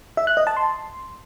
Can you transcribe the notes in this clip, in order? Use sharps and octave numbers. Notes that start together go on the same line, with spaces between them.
E5
F#6
D#5
A5
C6